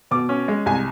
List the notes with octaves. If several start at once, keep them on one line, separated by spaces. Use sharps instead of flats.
B2 D6
C#4
G#3
C2 G#5